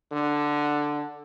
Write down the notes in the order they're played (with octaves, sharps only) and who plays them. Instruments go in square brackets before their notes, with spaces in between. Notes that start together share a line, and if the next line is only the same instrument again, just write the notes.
[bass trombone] D3